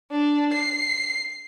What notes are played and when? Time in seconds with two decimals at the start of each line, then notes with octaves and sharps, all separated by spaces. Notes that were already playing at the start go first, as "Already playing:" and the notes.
0.11 D4
0.53 C7